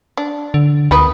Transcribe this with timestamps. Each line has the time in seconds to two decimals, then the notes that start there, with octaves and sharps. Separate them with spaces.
0.17 D4
0.54 D3
0.91 D2 D#3 B3 B4